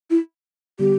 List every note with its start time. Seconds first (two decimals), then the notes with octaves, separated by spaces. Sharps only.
0.10 E4
0.79 D3 G3 B3 G4